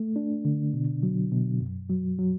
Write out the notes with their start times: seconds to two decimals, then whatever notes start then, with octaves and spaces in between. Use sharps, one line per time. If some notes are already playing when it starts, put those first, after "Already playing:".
Already playing: A3
0.16 D4
0.45 D3
0.73 B2
1.03 F#3
1.32 B2
1.60 F#2
1.89 F#3
2.19 F#3